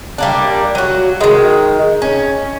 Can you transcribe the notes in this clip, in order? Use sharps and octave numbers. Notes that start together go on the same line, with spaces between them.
G3 A#3 D4
F#3 F#4
D#3 G#3
C#4